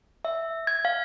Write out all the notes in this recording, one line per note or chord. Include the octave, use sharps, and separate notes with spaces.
E5
G#6
F5